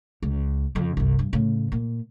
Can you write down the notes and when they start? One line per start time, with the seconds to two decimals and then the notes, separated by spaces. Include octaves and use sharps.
0.23 C#2
0.75 F2 C#3
0.97 G1 C2
1.19 G2
1.33 A2 C#3
1.72 A#2